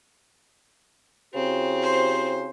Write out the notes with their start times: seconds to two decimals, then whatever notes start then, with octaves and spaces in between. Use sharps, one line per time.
1.35 C#3 C4 E4 F#4 G4
1.83 C5